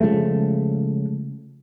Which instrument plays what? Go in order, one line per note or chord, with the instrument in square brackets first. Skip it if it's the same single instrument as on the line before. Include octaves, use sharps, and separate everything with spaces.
[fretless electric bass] C#3 F3 G#3 A3